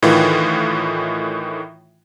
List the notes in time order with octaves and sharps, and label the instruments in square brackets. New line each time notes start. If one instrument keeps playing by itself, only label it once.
[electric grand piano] A2 D#3 E3 F4